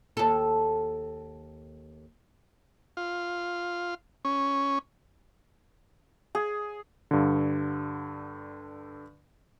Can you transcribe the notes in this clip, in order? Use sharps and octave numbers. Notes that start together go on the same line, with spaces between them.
D#2 A4
F4
C#4
G#4
G2 D3